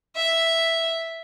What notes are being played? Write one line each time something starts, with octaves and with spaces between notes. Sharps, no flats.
E5